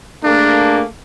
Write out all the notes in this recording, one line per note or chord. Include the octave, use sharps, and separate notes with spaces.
A3 A#3 D4 G#4